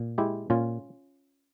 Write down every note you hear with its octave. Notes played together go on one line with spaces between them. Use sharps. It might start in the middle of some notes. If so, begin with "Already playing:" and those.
Already playing: A#2
G#3 E4 G4
A#2 C#4 F4